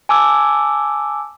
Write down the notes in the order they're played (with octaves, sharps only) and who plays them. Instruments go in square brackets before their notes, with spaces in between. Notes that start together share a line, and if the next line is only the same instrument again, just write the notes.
[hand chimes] G#5 A5 D6 E6